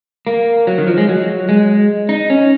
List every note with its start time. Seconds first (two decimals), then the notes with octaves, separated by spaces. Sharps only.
0.27 A#3
0.67 F#3
0.78 D#3
0.88 F3
0.97 G#3
1.08 F#3
1.49 G#3
2.09 D#4
2.30 C#4